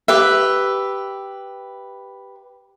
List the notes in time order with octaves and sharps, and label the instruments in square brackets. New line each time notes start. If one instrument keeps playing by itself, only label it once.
[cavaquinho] G4 B4 E5